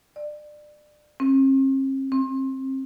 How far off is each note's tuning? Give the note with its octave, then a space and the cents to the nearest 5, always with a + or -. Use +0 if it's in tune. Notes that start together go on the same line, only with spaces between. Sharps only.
D5 +25
C4 +45
C4 +25